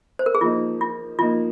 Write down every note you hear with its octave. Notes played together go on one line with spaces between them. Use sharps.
C5
A#4
G#4
F3 A#3 D#4 F4
F4
F3 A#3 D#4 F4